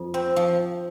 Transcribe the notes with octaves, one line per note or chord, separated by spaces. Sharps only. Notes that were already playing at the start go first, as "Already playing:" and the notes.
Already playing: F2
C4
F3